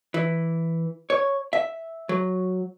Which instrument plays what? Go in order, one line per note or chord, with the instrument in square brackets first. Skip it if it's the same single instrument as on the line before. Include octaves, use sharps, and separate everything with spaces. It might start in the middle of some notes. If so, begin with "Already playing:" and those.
[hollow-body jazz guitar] E3
C#5
E5
F#3